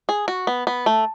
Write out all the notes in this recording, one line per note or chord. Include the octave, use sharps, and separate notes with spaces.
G#4
F#4
B3
B3
A3